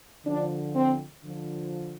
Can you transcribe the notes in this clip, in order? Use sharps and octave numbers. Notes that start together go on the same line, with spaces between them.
D3 F3 D4
C4
D3 F3